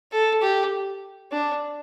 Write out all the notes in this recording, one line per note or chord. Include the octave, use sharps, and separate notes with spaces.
A4
G4
D4